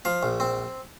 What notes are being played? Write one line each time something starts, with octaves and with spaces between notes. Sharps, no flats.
F3 F5
A#1
C4